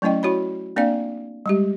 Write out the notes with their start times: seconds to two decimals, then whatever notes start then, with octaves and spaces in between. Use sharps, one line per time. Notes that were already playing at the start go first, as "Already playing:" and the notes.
0.02 F#3 A3 C#4 E4 D#5 G5
0.23 E4 F#4 C#5 B5
0.76 A#3 C4 D4 D5 F5
1.46 G3 G#3 G4